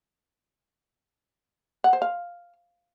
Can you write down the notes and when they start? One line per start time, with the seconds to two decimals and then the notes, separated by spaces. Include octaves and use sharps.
1.84 F#5
1.93 C5
2.02 F5